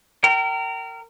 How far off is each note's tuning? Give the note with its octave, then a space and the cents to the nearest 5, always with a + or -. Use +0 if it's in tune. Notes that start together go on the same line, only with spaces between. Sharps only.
A#4 -25 G5 -30